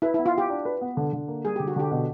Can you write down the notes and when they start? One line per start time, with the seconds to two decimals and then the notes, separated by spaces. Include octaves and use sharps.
0.02 E4 B4
0.14 E4
0.19 B3
0.26 F4
0.33 F#4 G4
0.50 D4
0.65 B4
0.81 B3
0.97 D3
1.13 D3
1.28 A#3
1.45 G3 G#4
1.56 D3 G4
1.67 F#4
1.76 D3 G4
1.91 B2